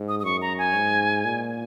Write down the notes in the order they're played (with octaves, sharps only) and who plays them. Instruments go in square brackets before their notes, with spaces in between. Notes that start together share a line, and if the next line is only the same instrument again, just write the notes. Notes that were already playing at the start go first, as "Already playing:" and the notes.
Already playing: [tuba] G#2
[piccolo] D#6
D#6
[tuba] F#2 [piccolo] C#6
[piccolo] A#5
G#5
[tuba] G#2
A#2